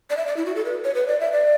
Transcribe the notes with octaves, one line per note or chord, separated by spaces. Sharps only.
D5
E5
D5
E4
F#4
A4
B4
C#5
B4
D5
E5
D5